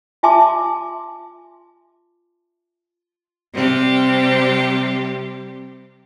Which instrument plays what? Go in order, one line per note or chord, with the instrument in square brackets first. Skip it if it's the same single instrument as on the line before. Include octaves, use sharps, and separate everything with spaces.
[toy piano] F4 E5 G#5 A5 C6 D6
[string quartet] C3 G3 C4 G4